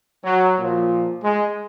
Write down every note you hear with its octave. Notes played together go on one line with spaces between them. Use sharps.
F#3
A#2 F3
G#3